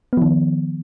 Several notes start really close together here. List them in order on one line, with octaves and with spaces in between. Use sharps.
B3 F3 D#3